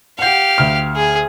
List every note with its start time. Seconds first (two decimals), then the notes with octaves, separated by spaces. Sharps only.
0.19 G4 F5 F#5 G6
0.58 D2 F6
0.96 G#4